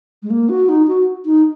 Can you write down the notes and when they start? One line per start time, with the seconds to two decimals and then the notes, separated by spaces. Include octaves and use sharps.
0.23 G#3
0.30 A#3
0.49 F#4
0.69 D#4
0.88 F#4
1.26 D#4